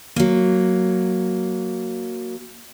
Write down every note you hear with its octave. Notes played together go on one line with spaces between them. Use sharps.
F#3 A#3